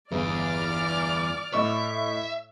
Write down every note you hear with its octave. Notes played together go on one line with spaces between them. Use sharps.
G1 E2 D5 D6 F6
A2 D#5 E5 C#6